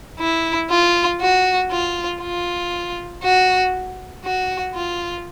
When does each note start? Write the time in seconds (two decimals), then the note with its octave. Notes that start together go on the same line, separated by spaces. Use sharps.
0.20 E4
0.70 F4
1.21 F#4
1.71 F4
2.22 F4
3.23 F#4
4.24 F#4
4.75 F4